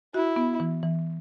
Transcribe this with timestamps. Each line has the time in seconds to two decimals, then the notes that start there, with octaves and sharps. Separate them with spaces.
0.14 E4 F#4
0.36 B3
0.60 E3
0.83 E3